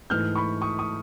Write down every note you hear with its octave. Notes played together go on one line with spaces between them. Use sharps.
G#2 E3 A3 F6 G6
B5 C#6
C#6 D#6
C#6 D#6